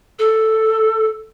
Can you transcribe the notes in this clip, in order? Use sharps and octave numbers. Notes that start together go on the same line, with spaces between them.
A4